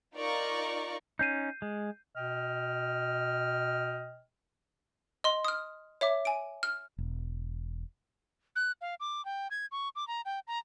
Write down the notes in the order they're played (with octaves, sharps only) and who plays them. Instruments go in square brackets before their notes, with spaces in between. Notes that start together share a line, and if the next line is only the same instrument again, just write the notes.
[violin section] D#4 F4 A#4 D5 A#5 C#6
[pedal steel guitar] C#4 D#4 [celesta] G6 C7 D#7
[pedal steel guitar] G#3
[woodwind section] B2 D#5 G5 F6
[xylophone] D#5 C6
D#6 F6
C#5 E5 D6
G#5 D7
F6
[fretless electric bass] E1
[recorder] F#6
F5
D6
G5
G#6
C#6
D6
A#5
G5
A#5